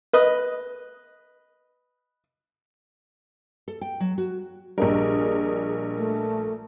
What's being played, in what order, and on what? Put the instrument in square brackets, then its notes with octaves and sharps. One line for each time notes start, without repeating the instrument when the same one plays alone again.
[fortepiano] B4 D#5
[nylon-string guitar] A4
G5
F#3
F#4
[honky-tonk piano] A#1 A#4 [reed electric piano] G3 D4 D#5 [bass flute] G#4
[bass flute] A3